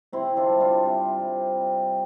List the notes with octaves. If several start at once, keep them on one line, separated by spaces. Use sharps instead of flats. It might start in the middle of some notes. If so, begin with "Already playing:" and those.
C3 C4 E4
D4 F4
G3
D4 F4
C3
G3
C3